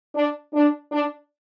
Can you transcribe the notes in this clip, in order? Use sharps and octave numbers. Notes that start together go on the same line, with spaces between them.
D4
D4
D4